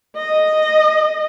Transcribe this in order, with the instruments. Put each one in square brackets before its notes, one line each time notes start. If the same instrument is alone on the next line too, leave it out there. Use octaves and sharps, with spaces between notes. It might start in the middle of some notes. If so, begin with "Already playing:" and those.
[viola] D#5